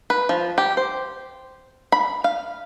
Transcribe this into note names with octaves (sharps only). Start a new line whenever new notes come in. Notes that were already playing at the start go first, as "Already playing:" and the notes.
B4
F3
G4
C5
B5
F5